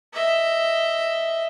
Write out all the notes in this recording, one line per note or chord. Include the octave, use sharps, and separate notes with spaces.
D#5 E5